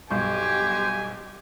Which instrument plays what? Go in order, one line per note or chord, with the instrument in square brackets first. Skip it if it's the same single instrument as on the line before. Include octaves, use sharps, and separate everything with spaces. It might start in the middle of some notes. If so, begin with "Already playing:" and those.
[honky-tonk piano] B1 G2 C#6 [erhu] G4 [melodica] C5 [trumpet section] G#5